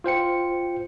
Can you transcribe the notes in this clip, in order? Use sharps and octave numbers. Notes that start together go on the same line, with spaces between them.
F4 C5 G5 C#7